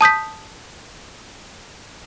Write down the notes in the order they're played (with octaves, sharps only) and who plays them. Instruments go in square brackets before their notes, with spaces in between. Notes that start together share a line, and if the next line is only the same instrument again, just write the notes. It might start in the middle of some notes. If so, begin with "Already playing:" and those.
[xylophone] A5 D#6 G6 B6